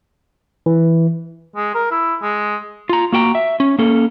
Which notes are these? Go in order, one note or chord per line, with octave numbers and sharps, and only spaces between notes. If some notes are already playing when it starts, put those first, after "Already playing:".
E3
G#3
A#4
E4
G#3
F4 A#5
A#3 F#4 G5 A#5
E5
C#4
A#3 C#4 A4